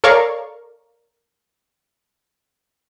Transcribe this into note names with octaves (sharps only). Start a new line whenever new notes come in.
A4 A#4 C#5 D5 F5 C#6